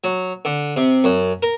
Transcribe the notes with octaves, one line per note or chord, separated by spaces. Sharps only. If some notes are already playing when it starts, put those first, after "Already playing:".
F#3
D3
C3
F#2
A#4